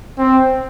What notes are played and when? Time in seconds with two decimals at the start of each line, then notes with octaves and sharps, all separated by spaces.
0.18 C4